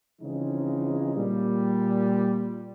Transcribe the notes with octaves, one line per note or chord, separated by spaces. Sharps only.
C#3 E3 F3 G#3 C4 D#4
A#2 G3